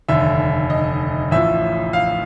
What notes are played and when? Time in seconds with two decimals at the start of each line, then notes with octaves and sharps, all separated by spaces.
0.08 F1 D#2 D3 E5
0.70 D#5
1.31 A1 A2 F3 E5
1.93 F5